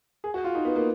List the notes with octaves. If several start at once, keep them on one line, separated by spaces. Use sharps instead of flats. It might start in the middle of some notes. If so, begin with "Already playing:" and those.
G#4
F#4
F4
D#4
B3
A#3